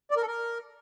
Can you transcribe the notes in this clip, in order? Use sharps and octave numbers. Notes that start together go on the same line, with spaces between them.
D5
A#4
A4
A#4